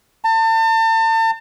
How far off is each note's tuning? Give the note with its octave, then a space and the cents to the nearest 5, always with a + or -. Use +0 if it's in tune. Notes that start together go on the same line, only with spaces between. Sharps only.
A5 +35